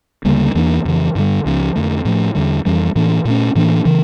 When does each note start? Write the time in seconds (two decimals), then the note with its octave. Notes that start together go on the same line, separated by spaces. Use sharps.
0.25 D2 C#3 G3 A#3
0.55 E2 E3 A#3 D4
0.85 F2 C#3 E3
1.15 G2 D3 G3
1.45 C#2 C#3 F3 C#4
1.76 F2 D3 A3
2.05 A2 F3 A3
2.35 E2 D3 G3
2.65 F2 E3 G3 C#4
2.96 A2 E3 A#3 D4
3.25 A#2 A3 C#4
3.56 A2 E3 A#3 D4
3.85 C#3 E3